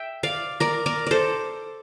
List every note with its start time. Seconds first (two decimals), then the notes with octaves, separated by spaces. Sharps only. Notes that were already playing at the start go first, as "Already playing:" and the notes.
Already playing: E5 G5
0.23 D5 F5
0.60 A#4 D5
0.86 A#4 D5
1.06 A4 C5 D5